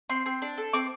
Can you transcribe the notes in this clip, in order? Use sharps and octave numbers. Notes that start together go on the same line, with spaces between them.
C4 C6
C4
D4
A4
C4 D6